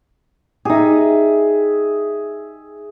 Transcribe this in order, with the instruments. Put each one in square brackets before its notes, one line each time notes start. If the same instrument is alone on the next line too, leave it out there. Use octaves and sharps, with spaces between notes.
[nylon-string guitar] D#4 G4 [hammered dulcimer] G#4 E5